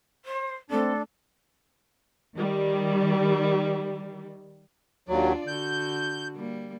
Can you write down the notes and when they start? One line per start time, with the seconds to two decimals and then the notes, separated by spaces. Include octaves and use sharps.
0.25 C5
0.70 A3 C4 D4 A4
2.37 D#3 G3
5.09 D#2 F#3 D4 F4 D5
5.48 D3 F#4 G6
6.36 G3 A#3